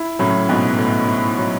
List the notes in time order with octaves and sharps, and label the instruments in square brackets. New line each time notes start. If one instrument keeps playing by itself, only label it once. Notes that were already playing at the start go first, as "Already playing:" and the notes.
Already playing: [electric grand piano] E4
[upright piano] A2 C#3 [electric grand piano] F#3
[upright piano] G#2 B2 [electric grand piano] B3
[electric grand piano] A2
E4
F#3